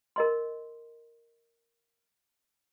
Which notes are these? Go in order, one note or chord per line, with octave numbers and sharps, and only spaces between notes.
A#4 D#5 C6